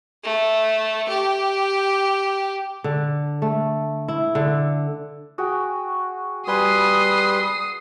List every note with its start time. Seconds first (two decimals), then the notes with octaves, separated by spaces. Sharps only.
0.24 A3
1.09 G4
2.84 D3
3.42 A3
4.08 E4
4.35 D3
5.38 F#4 G#4 G5
6.48 G3 B4 G#5 C6 D#6 C7